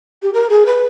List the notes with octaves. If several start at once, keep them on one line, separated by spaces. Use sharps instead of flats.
G4
A#4
G#4
B4